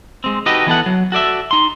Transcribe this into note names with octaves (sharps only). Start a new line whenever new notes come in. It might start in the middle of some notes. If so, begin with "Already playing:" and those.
G#3 C4
D#4 F#4 G4 A4 B4 D#5
E3 B3 A4 F#5
F#3
F#4 A4 D5 E5
D#4 C6